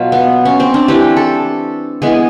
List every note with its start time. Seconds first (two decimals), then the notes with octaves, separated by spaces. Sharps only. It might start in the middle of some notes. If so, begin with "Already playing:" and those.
Already playing: B2 F#3 F4
0.12 B3
0.45 C#4
0.60 C4
0.74 D4
0.88 E3 A3 G4
1.17 A4
2.02 E3 G#3 B3 G#4